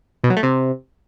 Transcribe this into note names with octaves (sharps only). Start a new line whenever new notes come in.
B2
F#3
A3
C3